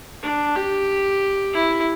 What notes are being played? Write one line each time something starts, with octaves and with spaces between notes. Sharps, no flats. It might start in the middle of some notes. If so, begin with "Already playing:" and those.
D4
G4
E4